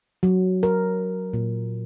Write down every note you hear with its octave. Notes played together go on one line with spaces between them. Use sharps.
F#3
A#4
A#2